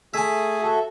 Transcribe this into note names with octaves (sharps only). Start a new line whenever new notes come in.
A3 G#4 E5 G#5
F#4 A4 E5